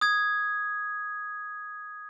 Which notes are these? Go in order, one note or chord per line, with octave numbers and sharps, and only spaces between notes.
D#6 G#6